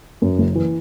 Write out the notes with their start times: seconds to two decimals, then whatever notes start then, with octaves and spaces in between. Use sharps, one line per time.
0.22 F#2
0.39 F#1
0.55 E3